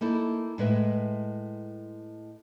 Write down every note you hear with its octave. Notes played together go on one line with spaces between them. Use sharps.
A#3 D#4 E4 A4
A2 G#3 B4 E5